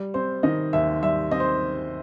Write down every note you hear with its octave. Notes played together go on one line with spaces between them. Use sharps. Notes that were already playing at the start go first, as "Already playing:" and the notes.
Already playing: G3
C4 C5
D#3 D#5
D#2 E5
G3 E5
C4 D#5
C5